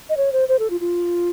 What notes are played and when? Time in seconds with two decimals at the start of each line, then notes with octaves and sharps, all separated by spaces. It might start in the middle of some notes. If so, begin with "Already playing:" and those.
0.09 D#5
0.17 C#5
0.33 C5
0.48 C5
0.59 A4
0.70 F4
0.81 F4